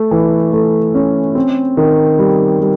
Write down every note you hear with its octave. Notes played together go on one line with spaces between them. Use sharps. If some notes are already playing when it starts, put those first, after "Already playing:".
Already playing: A3
E3
A3
C#4
C4
D#3
G3
G3